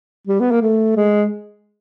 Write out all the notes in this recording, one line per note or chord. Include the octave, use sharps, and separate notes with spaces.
G3
B3
A#3
A3
G#3